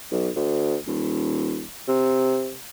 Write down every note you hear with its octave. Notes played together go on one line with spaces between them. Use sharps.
B1
D2
D#1
C3